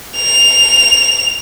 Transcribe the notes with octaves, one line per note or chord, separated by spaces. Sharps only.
F7